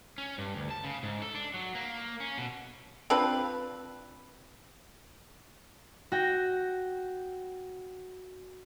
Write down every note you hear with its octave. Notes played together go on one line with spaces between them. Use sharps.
C#4
G2
D2
A5
C#3
G#2
A4
D4
F#3
A#3
C#4
B2
C4 D4 F4 B4
F#4 G5 A#6